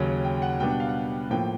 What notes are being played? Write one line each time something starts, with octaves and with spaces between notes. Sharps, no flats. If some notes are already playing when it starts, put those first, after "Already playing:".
Already playing: D#2 C#3 F#3
G5
F#5
B2 G3 B3 D4 G5
F#5
F5
F#5
A2 F3 A#3 G5